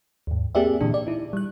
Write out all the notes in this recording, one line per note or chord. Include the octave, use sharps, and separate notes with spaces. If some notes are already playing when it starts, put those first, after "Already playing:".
D#2 G#2
A#3 C4 G4 G#4 D5 E5
A#2 D3 E3 D4
D5
D#4 E4
G3 F#6